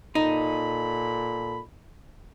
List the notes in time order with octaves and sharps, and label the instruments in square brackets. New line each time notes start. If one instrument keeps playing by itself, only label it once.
[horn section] A#2 A4 B5 [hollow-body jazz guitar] D#4